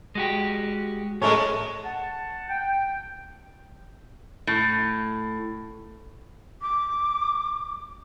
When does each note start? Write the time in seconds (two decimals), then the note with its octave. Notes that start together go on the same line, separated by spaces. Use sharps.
0.15 G#3 F#4 G4
1.22 A2 G#3 A3 C#4 A#4
1.84 F#5 A5
2.48 G5
4.47 A2
6.62 D6